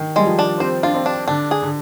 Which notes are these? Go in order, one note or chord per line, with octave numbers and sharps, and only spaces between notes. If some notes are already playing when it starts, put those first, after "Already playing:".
Already playing: D#3
G3 G#3
F3
D4
C4 C5
D4 F4
C4
D4
D3 D4
G#4
D3